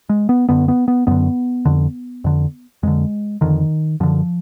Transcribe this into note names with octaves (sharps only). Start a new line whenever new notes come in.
G#3
B3
F#2 D3 B3
B3
B3
F#2 D3 B3
F2 D3
F2 D3
F2 D3 G#3
F2 D3 D#3
F#2 D3 F3